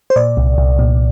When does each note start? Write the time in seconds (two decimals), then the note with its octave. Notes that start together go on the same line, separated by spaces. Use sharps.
0.10 C5
0.16 A#2 D5
0.37 C2
0.58 C2
0.79 A#2